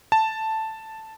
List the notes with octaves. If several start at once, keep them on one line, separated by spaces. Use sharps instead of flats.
A5